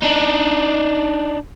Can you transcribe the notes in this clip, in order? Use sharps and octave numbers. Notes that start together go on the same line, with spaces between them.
D4 D#4